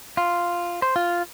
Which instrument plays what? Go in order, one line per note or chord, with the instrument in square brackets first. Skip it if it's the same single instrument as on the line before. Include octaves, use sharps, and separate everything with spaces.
[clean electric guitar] F4
C5
F4